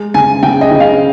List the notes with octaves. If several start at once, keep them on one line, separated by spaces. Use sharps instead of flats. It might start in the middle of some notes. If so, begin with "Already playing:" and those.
Already playing: G#3
C#3 G#5
C#3 G5
D#5
C#3
F5